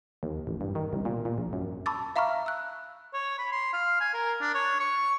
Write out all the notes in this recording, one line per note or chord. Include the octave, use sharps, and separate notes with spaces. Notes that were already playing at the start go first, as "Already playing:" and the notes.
D#2
A1
G2
D#3
C2
A#2
A#2
A#1
F#2
A5 B5 C#6 D6 E6 A6
E5 F5 A#5 B5 C#6 F6
E6 F#6
C#5
B5
C6
F5
G#5
A#4
D4
C#5
C#6